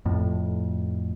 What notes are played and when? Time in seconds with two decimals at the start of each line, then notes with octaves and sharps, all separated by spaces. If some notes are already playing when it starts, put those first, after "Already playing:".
0.05 F2 A2